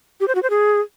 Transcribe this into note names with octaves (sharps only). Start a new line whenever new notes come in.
G4
C5
F#4
C5
G#4